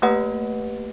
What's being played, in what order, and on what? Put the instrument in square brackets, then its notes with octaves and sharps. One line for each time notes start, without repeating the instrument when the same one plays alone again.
[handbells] A3 A#3 G4 B4 D#5 F#5